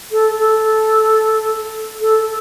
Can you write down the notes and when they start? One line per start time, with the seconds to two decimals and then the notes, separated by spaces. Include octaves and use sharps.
0.12 A4
0.39 A4
2.01 A4